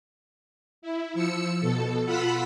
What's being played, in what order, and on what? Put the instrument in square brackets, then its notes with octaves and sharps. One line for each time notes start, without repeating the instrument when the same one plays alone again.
[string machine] E4
F3 E6 C#7
B2 A4
F4 F#5 B5 E6 B6